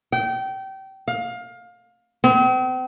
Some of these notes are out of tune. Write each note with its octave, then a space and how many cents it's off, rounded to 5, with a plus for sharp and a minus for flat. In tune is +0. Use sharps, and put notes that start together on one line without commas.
G5 -25
F5 +25
C4 -40